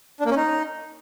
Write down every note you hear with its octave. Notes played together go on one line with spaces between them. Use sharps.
D4
A#3
C#4
D#4